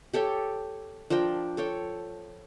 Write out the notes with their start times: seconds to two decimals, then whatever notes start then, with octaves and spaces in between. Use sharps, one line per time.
0.13 G4 A4 C#5 G5
1.10 F3 D4 A#4 G5
1.57 A4 C#5 G5